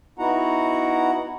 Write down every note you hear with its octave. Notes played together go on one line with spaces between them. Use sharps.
B3 D#4 E4 F#4 F#5 A#5